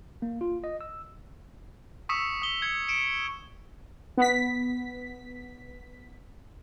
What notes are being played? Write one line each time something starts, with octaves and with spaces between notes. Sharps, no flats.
A#3
F4
D#5
E6
C#6 D#6 E6 B6 C#7 E7
D#6 G7
G#6 C#7
C#7 D7 E7
B3 B6